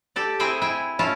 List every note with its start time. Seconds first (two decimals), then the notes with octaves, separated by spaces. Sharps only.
0.16 G4 A4 D5
0.40 C4 E4 G#4 C5 G5 G#5
0.61 E4 G5 G#5
0.99 C#4 E4 F4 A5